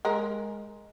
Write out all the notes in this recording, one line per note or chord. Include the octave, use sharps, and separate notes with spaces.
G#3 A#4